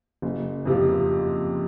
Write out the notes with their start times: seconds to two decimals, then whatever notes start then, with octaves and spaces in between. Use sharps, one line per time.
0.22 F#1
0.65 F2 C3 F3